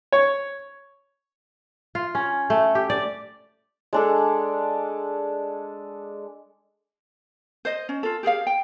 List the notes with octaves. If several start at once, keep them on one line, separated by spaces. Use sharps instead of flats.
C#5
F4
C#4
A3
G4
D5
G#3 D4 A4
C5 D#5
C#4
F4 A4
G4 G#4 A#4 F5
G5